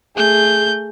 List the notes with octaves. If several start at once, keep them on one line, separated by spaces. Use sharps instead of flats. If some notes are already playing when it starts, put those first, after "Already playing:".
A3 G#4 G6